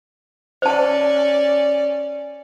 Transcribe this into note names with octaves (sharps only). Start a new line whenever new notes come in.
C#4 C5 D5 A5